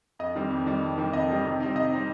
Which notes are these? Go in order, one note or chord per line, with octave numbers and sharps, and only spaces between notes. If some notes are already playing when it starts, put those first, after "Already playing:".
F2 D#5
D#3 G3 C4
F2
D#3 G3 C4
F2
D#3 G3 C4
F2 D#5
D#3 G3 C4
C3
G3 C4 D#4
C3 D#5
G3 C4 D#4